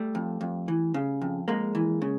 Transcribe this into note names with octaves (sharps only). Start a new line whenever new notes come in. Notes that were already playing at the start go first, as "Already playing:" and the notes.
Already playing: G3 A3
F2
F2
E3
C#3
F2
F2 G#3 A#3
E3
C#3